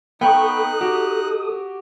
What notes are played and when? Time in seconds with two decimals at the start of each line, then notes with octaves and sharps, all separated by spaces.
0.21 B3 D#4 A4 G5 B5 C#6 D#6 F#6
0.81 F#4 G4